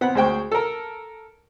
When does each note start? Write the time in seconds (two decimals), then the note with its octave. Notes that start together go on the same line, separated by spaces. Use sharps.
0.01 B3 C4 F#5
0.15 D2 G#3 C5 G5 C#6
0.52 A4 A#4